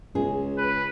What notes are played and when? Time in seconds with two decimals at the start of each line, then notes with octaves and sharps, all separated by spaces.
0.15 C#2 G#4
0.58 B4